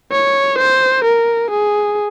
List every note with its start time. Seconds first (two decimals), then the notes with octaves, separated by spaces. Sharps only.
0.12 C#5
0.58 C5
1.04 A#4
1.50 G#4